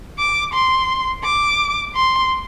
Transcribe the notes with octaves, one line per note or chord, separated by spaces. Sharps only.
D6
C6
D6
C6